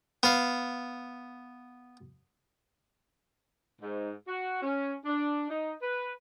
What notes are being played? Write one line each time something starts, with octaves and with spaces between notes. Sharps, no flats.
B3 F5
G#2
F#4
C#4
D4
D#4
B4